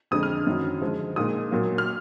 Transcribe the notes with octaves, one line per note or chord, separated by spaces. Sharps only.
F2 D3 G#3 D4 D#6
F6
F#2 D#3 F#3
D3 F3 G#3
A#2 G#3 D#4 D#6
A#2 F#3 A#3
F6